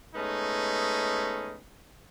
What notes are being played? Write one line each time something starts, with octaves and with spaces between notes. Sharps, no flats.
G#3 A3 B3 C#4 D#4